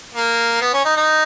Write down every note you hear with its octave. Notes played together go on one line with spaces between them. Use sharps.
A#3
B3
C#4
D#4
D#4